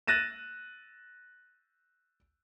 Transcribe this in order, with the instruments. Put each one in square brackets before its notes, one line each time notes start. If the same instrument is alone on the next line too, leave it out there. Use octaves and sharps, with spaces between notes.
[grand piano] F#6 A6 A#6 D#7 E7